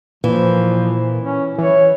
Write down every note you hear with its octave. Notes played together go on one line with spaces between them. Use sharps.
A#2 E3 F3
C#4
E3 C#5